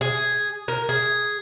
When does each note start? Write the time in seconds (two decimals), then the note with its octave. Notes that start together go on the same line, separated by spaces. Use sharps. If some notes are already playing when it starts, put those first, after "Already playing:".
0.01 G#4
0.68 A#4
0.89 G#4